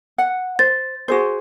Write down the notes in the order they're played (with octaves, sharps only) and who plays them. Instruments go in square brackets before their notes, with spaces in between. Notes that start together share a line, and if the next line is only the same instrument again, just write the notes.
[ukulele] F#5
[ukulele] C5 [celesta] A6
[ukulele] F#4 G#4 C5